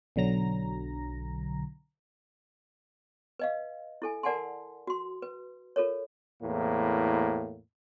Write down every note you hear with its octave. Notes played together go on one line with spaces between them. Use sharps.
B1 D3 F#3 A#5 A#6
B4 D#5 F5
E4 A4 G#5
A#4 D5 F#5 G#5 A5 C6
F#4 C6
B4
F4 A4 A#4 C#5
E2 A2 A#3